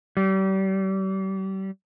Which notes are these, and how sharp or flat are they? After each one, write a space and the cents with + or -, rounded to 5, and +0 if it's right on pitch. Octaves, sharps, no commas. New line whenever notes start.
G3 -35